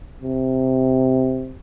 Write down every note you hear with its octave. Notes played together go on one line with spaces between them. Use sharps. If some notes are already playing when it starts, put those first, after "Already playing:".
C3